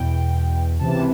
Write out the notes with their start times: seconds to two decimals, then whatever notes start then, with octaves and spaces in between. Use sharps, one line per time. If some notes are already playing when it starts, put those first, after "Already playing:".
Already playing: E2 B2 G5
0.79 C#2 C3 E3 A5